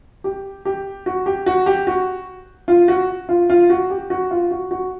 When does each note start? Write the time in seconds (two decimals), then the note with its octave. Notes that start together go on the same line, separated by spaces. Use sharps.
0.24 G4
0.65 G4
1.06 F#4
1.26 G4
1.46 F#4
1.66 G4
1.87 F#4
2.68 F4
2.88 F#4
3.29 F4
3.50 F4
3.70 F#4
3.90 G4
4.10 F#4
4.31 F4
4.51 F#4
4.71 F#4